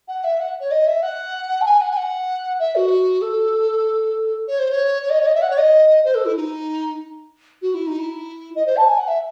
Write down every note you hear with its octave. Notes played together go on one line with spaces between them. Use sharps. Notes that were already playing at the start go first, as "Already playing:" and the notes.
F#5
E5
F#5
C#5
D#5
E5
F#5
A5
G#5
F#5
G#5
F#5
E5
F#4
A4
C#5
C5
C#5
C#5
D#5
C#5
D#5
E5
F#5
C#5
D#5
C5
A4
E4
D#4
F#4
E4
D#4
E4
D#5
C5
A5
G#5
F#5
E5